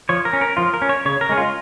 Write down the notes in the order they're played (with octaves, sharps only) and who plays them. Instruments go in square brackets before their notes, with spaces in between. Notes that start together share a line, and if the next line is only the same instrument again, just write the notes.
[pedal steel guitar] F3 C#5
A#4
C#4
A#4
F3 F4
A#4
C#4
C#5
C#3 C#5
A#4
G#3 C#4
F4